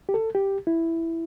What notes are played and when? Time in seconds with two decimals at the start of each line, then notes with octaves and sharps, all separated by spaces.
0.09 G4
0.14 A4
0.35 G4
0.67 E4